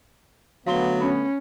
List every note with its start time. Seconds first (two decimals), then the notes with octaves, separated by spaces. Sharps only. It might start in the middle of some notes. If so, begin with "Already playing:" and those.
0.67 D3 F#3 A3 B3 F5 C6 G7
1.01 C#4 B5